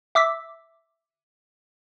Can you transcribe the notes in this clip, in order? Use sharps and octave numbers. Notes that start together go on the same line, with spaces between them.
E5 D6 E6 B6